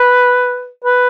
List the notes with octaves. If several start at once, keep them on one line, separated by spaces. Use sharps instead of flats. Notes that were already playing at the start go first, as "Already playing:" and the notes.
Already playing: B4
B4